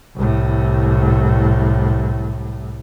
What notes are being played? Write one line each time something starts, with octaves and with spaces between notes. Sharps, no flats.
C2 A2